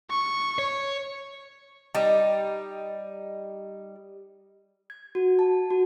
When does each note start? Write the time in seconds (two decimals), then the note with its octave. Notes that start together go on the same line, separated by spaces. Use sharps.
0.10 C#6
0.58 C#5
1.95 G3 D#4
4.90 G#6
5.15 F#4
5.39 A5
5.70 F#4